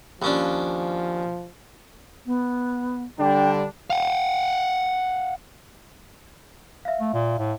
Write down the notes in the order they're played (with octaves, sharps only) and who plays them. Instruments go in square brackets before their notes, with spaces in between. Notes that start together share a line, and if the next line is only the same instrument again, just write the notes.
[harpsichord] D#2 C#4 D4 [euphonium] F3
[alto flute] B3
[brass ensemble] D3 G3 D4 [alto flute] G5
[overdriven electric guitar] F5 F#5
[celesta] E5 F5
[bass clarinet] A3
A#2
A2